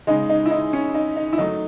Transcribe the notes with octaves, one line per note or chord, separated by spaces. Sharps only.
C#3 G#3 D#4
D#4
E4
D#4
C#4
D#4
D#4
E4
D#3 F#3 A3 D#4